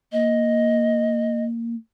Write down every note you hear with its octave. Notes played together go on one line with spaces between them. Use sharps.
A#3 D#5